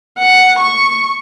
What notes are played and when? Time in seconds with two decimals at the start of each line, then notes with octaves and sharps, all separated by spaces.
0.19 F#5
0.59 C#6